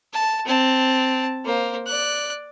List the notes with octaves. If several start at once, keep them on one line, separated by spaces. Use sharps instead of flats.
A5
C4 A5
A#3 C5
D5 F#6